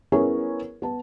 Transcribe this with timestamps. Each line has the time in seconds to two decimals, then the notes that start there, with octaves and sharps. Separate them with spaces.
0.12 B3 C#4 E4 G#4 A#4 C#5
0.82 B3 A5